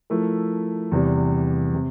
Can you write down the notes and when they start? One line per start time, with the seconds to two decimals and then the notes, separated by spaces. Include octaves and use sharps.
0.10 F3 A3 E4 A#4
0.92 E2 C3 E3 G3
1.75 C3